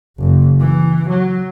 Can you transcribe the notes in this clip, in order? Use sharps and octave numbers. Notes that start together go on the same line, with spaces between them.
F#1
E3
F#3